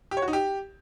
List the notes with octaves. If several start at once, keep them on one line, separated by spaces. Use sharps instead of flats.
G4
C#5
F#4
D#4
G4